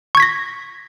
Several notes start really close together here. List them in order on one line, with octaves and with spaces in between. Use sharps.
C#6 G#6 B6 A#6